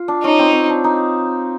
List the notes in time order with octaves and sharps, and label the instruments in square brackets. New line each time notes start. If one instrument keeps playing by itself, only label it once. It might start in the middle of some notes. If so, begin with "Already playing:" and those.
Already playing: [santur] F4
D4
[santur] C#4 [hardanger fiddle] D#4
[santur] C4
C4
D4
D#4